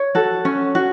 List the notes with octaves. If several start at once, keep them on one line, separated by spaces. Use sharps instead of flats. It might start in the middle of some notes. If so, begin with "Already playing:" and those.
Already playing: C#5
F#4 A4
C#4
F#4